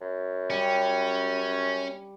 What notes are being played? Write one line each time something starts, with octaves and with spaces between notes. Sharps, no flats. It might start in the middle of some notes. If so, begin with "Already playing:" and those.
F#2
G3 C#4